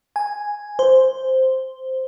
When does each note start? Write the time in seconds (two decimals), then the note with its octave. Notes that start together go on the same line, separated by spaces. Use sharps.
0.16 G#5
0.79 C5